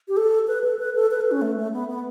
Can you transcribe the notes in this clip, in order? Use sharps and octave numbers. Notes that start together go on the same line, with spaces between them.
G4
A4
B4
A4
B4
A4
B4
A4
C#4
A3
A3
B3
B3